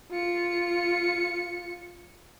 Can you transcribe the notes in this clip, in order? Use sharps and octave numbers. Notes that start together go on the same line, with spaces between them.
F4 C#7